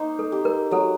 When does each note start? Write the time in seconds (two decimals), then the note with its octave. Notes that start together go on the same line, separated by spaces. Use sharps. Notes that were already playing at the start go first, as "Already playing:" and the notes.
Already playing: A#3 D#4 C5
0.19 A4
0.32 G4
0.45 A#4
0.71 F#3 A4